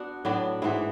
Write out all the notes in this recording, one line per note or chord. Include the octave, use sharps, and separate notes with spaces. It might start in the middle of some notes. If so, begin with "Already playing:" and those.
Already playing: B3 D4 F#4
A2 F#3 B3 D4
G#2 E3 B3 E4